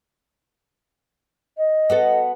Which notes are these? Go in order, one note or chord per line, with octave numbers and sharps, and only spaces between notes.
D#5
B3 F#4 A4